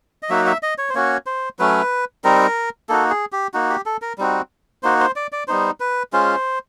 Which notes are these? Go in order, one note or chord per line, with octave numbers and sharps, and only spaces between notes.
D#5
F#3 A#3 D#4 F#4 E5
E5
D#5
C#5
C5
A#3 C#4 F#4 C#5
C5
F#3 A3 C#4 B4
G3 C4 D#4 A#4
A#3 D#4 F#4 A4
G#4
G4
A#3 D#4 F#4
G4
A4
A#4
G3 C4 D#4 F#4
A#3 D#4 F#4 C5
C5
D5
D5
G3 B3 D#4 C5
B4
G#3 C#4 F4 C5